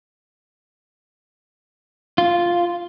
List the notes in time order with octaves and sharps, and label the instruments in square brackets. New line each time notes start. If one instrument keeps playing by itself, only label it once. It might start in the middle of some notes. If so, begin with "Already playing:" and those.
[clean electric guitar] F4